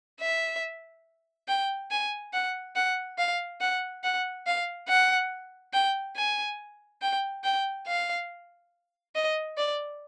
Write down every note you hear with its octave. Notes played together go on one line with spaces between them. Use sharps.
E5
G5
G#5
F#5
F#5
F5
F#5
F#5
F5
F#5
G5
G#5
G5
G5
F5
D#5
D5